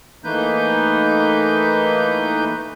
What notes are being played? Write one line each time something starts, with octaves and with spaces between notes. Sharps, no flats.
E3 A3 A#3 D#4 B4 G6